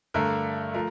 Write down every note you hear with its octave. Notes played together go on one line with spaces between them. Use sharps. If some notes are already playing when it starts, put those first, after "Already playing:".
G2 D3 A3 A#4
F3 A3 A#4